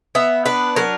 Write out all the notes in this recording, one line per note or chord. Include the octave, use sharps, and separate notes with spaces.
B3 E5
D4 B4
F#3 A#4